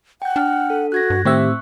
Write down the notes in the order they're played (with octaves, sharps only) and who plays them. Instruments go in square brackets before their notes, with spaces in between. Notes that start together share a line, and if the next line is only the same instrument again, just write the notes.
[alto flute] F#5 [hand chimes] G5 G6
[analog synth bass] D4 [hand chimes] G5 F6
[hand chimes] A4
[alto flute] F#4 [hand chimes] F#6 G#6 A#6
[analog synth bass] G2
[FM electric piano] A2 C4 E5 [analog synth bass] D#3 [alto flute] G4 [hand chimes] C#6 F#6